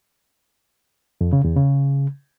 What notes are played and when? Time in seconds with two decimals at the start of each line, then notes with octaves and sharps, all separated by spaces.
1.21 F2
1.33 C#3
1.44 E2
1.56 C#3